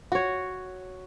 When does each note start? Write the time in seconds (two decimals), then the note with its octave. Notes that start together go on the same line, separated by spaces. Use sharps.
0.12 F#4 C#5